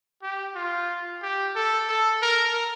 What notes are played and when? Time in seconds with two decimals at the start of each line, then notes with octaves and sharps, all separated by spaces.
0.22 G4
0.55 F4
1.22 G4
1.55 A4
1.89 A4
2.22 A#4